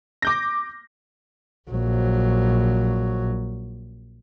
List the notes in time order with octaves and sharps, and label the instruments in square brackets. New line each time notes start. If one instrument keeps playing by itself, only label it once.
[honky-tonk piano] D6 G6 A#6
[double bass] A#1 F#3